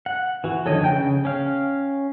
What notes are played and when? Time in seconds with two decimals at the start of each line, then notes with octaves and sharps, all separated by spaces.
0.06 F#5
0.44 E3 F#4
0.66 F2 D3 D#3 A4 C#5 D#5
0.84 C#3 F4 G5 G6
1.25 C#4 F5